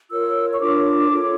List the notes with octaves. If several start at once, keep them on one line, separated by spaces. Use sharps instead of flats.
F4 A#4 C#5 E6
C#6
D4 F4 A#4 C#5 D6
F4 A4 C#5